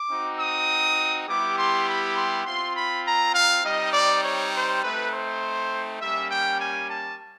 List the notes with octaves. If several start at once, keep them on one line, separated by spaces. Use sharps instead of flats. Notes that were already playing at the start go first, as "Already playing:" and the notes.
Already playing: D6
C4 D#4 F#4
D#6
G3 B3 E4 G4 D6
C6
B5
C6
C4 F4 C6
B5
A#5
F5
G3 C4 D#4 D#5
D5
C#5
C5
A3 C4 D#4 B4
C5
G3 A#3 C#4 E5
G5
G#5
A5